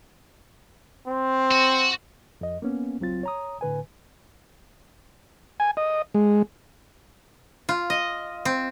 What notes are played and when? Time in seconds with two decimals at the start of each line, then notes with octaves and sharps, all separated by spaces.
1.07 C4
1.51 F#4
2.41 F2 D#5
2.62 A#3 B3 C#4
3.00 C#2 F#3 C4 F4 A6
3.23 C#5 A#5 D#6
3.61 A2 D3 B4 G#5
5.60 G#5
5.77 D#5
6.15 G#3
7.69 F4
7.90 D#5
8.45 C4